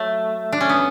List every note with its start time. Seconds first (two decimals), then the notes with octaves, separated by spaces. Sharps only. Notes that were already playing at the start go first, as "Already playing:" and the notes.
Already playing: F#3 A3
0.52 D4
0.61 C#4
0.69 B3